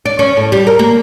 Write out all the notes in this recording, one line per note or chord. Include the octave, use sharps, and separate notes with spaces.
D5
C#4
A2
G3
A#4
A#3